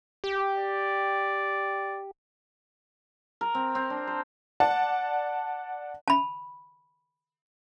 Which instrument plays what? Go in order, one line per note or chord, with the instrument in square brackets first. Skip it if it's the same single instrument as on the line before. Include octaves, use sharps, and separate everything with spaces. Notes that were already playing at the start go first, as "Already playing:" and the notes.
[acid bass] G4
[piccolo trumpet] D5
[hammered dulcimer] A#4
C4
C4
D4
C5
[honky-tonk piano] D5 F#5 A5
[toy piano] A5 B5